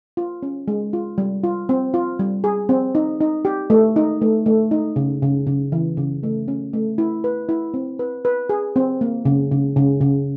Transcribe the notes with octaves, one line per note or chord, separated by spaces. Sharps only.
F4
C#4
G#3
F4
G3
F4
C4
F4
G3
G#4
C4
D#4
D#4
G4
A3
D#4
A3
A3
D#4
C#3
C#3
C#3
E3
C#3
A3
C#4
A3
E4
B4
E4
C4
B4
B4
G#4
C4
A#3
C#3
C#3
C#3
C#3